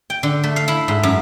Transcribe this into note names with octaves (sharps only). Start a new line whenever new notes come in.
G5
D3
A3
F5
E4
G#2
F#2